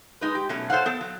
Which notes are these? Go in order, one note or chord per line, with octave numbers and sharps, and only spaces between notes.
G#3 D#4 B4
G4
B2 F#3 A3 C#4
A4 C5 C#5 F5 F#5
B3 A4
F#3